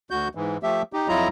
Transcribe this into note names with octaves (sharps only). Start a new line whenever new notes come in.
D2 F#4 G6
G#2 E3
F3 A3 G4 E5
D#4 G4
F2 F#3 E4 F4 D#5 A#5